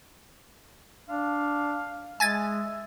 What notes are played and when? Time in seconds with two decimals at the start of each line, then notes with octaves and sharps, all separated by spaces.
1.09 D4 F5
2.20 G#3 E5 G#5 G#6 A6